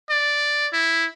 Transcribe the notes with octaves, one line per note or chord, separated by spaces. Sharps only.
D5
E4